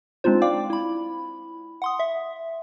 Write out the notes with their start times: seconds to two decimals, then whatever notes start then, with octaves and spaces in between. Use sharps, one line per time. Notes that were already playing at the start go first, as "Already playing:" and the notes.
0.24 G#3 C4 D4 D#4 F4 C5
0.42 D5 F5 G5 D6
0.70 E4 B5
1.82 F#5 C6 D#6
1.99 E5